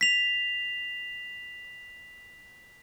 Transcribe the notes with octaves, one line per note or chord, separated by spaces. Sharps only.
B6 F7